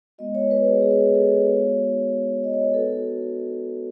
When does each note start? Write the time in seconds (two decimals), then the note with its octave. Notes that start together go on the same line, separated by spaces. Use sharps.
0.18 G#3 B3 F#4 D#5
0.35 C#5
0.51 B4
0.67 G#4
0.82 G#4
1.15 A4
1.46 G#3 B3 D#4 F#4 C#5
2.44 D#5
2.54 C#5
2.64 B4
2.74 B3 D#4 F#4 A4